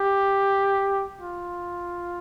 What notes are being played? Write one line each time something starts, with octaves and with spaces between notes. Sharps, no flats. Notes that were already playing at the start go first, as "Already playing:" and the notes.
Already playing: G4
F4